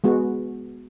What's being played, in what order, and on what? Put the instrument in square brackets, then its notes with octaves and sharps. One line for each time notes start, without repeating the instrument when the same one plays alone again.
[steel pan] G#3 B3 F#4